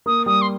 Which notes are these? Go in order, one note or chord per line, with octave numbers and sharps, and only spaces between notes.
A#3 D#6
G3 D#6
C6